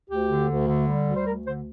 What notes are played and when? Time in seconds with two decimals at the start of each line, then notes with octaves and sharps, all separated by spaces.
0.10 D2 G4
0.29 D3
0.49 D2
0.68 D3
0.88 G3
1.07 D2
1.16 C5
1.27 D2 A#4
1.46 D3 C5